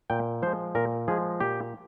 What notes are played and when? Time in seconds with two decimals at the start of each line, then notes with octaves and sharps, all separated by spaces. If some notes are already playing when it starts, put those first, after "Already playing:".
0.10 A#2 G5
0.42 F3 G#3 C5
0.75 A#2 A#4
1.08 F3 G#3 G#4
1.40 A#2 G4